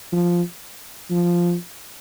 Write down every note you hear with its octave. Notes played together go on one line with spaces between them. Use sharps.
F3
F3